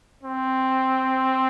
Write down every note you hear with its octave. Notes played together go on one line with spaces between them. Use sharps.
C4